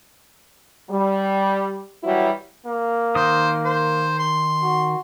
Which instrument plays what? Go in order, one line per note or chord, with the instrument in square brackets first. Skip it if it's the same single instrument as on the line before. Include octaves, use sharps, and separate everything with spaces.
[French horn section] G3
E3 F#3 G3 E4 F#4
[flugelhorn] A#3
[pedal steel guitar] D#3 D#6 [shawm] C5
[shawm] C5
C6
[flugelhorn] F#4